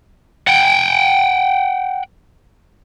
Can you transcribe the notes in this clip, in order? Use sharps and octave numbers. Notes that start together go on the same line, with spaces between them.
F#5 G5